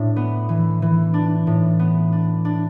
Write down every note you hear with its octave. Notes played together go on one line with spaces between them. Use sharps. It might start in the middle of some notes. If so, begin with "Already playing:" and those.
Already playing: A2 D4
B3
E3
E3
D4
A2
B3
D4
D4